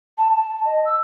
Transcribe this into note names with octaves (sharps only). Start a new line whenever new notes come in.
A5
A5
D#5
E6